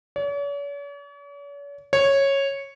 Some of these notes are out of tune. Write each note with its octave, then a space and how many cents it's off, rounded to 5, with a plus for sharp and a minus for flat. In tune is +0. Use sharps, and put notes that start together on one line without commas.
C#5 +45
C#5 -10